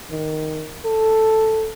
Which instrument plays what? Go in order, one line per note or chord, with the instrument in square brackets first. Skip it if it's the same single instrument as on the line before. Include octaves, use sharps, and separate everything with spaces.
[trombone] D#3
A4